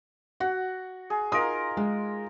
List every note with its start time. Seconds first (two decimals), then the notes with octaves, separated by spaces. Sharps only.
0.40 F#4 F#5
1.10 G#4
1.32 D#4 F4 A#4 D#6
1.77 G#3